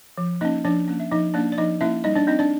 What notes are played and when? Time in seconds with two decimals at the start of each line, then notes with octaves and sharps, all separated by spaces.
0.17 F3
0.41 A#3 C#4 D#4 D#5
0.65 F3 D4 D5
0.88 A#3 C#4
1.00 E5
1.12 F3 D#4 D#5
1.34 A#3 C#4 D4 D5
1.52 D5
1.58 F3 D#4 D#5
1.81 A#3 C#4 E4 E5
2.04 G3 D#4 D#5
2.15 D4 D5
2.27 C4 D#4 D#5
2.39 D4 D5